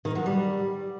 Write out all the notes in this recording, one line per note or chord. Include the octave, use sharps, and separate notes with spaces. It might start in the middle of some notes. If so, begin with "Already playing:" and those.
D#3
F#3
G3